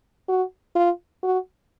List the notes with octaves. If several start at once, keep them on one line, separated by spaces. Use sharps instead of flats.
F#4
F4
F#4